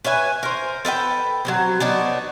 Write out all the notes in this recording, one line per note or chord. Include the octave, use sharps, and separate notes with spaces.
B4 C#5 E5 G#5
A#4 C5
A4 B4 D#5 G5
F#3 G#3 C4
B3 D4 D#4 C#5